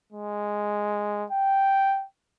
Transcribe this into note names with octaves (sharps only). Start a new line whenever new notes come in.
G#3
G5